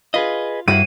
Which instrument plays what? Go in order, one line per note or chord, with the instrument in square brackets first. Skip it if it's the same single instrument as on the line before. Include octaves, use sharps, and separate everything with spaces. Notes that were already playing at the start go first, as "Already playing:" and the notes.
[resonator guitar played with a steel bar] F4 [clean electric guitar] G#4 B4 D#5
[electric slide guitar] G2 [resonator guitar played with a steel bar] A#3 E4 F#4 [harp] D#7